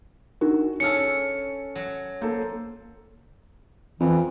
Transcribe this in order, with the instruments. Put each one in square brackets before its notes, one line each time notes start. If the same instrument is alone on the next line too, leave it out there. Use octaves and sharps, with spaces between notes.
[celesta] D4 D#4 A#4 [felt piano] F#4
[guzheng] C#4 G#4 A4 [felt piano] C#5 F6 [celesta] C#7
[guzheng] F#3
[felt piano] A#3 A4 [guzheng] C5
[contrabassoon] F2 [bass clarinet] E3